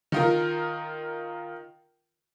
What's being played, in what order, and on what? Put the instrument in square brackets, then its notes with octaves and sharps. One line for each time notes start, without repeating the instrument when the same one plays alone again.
[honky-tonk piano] D#3 F4 A#4